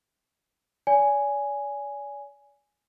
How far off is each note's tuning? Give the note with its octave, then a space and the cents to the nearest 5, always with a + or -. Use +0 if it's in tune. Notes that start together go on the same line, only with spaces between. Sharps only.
D5 -45 G#5 +0